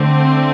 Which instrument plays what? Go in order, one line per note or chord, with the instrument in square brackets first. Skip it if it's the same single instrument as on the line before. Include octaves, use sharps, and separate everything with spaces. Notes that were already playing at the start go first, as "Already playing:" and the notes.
Already playing: [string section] D3 A3 C4